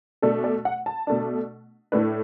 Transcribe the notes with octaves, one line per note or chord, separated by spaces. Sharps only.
B2 A3 D4 A4
D5
F#5
A5
B2 A3 D4
A2 A3 D4 B4